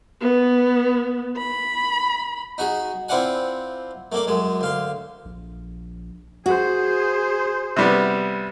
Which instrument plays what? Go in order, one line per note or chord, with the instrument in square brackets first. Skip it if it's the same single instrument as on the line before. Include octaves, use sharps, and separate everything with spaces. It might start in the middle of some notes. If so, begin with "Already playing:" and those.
[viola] B3
B5
[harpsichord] D#4 F#4 G#4
C4 E4 F4 D5 F#5 G#5
A3 A#3 D5
F#2 G#3
D2 F5 C6
[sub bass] A#1
[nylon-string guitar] F#4 [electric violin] G#4 C5
[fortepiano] C3 G3 B3